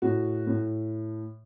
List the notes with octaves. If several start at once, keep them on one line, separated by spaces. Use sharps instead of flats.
A2 F#4
A2